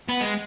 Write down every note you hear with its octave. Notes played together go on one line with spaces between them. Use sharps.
B3
G#3